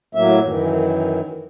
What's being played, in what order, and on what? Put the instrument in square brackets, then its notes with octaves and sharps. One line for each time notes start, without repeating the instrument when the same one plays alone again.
[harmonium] A2 F#3 A#3 E5
F#2 D#3 E3